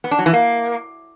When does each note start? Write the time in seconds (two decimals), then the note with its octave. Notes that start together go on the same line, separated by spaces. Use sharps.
0.04 B3
0.11 D4
0.19 F#3
0.26 E3
0.33 A#3